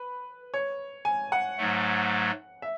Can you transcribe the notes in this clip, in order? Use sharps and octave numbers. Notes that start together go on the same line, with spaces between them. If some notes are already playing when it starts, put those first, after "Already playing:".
Already playing: B4
C#5
G#5
F#5
G#2 F#3 A3
E5